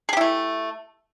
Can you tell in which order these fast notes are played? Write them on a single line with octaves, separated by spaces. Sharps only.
G#4 G4 E4 A3